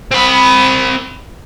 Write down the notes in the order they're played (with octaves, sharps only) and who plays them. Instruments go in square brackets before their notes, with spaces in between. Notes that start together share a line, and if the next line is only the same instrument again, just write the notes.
[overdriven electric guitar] C4 B5